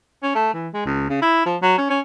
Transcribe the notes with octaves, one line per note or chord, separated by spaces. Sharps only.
C#4
A3
E3
G#3
C#2
C#3
E4
F3
F#3
C#4
C#4